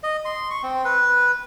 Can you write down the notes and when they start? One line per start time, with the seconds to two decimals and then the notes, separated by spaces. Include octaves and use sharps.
0.03 D#5
0.25 C6
0.50 C#6
0.63 C4
0.85 B4